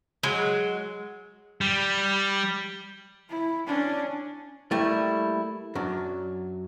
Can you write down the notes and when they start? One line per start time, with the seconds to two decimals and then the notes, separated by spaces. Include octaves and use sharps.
0.23 F#3 G#3
1.61 G3
3.29 E4
3.67 C#4 D4
4.71 G3 A3 A#3 E4
5.75 F#2 F#3 D4